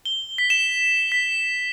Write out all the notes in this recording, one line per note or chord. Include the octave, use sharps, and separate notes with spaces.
G7
B6
E7
B6